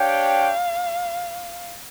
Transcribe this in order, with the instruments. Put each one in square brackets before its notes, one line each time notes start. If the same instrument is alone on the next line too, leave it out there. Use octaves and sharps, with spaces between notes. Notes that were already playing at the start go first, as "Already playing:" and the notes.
Already playing: [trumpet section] D4 G4 C#5 G5 [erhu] F5